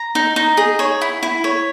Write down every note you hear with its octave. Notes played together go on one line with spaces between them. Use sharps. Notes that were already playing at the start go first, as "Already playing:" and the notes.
Already playing: A#5
D#4
D#4
G#4
C#5
E4
E4
C#5